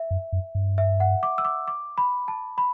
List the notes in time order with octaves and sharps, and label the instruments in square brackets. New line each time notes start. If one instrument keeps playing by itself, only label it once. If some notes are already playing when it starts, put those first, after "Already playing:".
Already playing: [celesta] E5
[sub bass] F#2
F#2
G2
[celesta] E5
F#5
D6
E6
D6
D6
B5
A5
B5